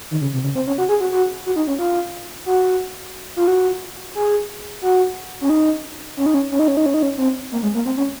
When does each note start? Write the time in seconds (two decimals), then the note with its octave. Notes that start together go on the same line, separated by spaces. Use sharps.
0.11 D#3
0.21 C#3
0.33 C3
0.44 C#3
0.55 C4
0.67 C#4
0.78 F#4
0.89 G#4
1.00 F#4
1.12 F#4
1.46 F#4
1.56 D#4
1.67 C#4
1.79 F4
2.46 F#4
3.36 F4
3.48 F#4
4.15 G#4
4.82 F#4
5.41 C#4
5.50 D#4
6.17 C#4
6.26 D#4
6.34 C#4
6.51 C#4
6.59 D#4
6.68 C#4
6.77 D#4
6.86 C#4
6.94 D#4
7.03 C#4
7.18 C4
7.52 A#3
7.63 G#3
7.75 A#3
7.86 C4
7.97 C#4